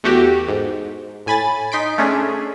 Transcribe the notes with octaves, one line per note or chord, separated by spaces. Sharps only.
E2 A3 F#4 G4
G#2
A2 G#5 B5 A6
D#4 C6 B6 D7
A3 C#4 D4 G#4